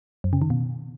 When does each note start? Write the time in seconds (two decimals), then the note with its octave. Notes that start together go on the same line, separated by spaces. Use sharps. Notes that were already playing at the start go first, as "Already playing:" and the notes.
0.24 F#2
0.33 C#3
0.42 D#3
0.50 B2